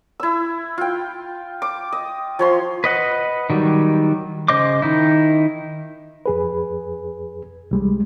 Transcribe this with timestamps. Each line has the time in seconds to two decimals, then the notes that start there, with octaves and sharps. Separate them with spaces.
0.20 E4 E6
0.78 F4 G5
1.62 D6
1.92 D#5
2.39 F3 C#5 C6
2.84 B4 D#5 F#5
3.50 D#3 F#3 G3
4.48 C#3 C5 D#5 C6 D6
4.82 D#3 D#4 E4
6.26 F2 G#4 B4
7.71 C2 G3 G#3